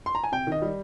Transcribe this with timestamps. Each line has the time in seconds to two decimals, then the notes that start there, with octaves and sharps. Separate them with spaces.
0.06 C6
0.15 A#5
0.24 G#5
0.32 C3 G5
0.47 D#3 D#5
0.62 G3